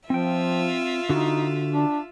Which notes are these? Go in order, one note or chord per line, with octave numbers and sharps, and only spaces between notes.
F3 C4 F4 E5 G5
D3 D#4 F#4
D4